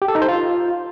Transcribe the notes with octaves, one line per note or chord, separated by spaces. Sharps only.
G4
A4
D#4
C5
F4